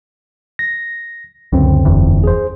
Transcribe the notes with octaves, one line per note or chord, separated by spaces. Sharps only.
A#6
C#2 F#2 D3 C4
F1 E2
G#4 C5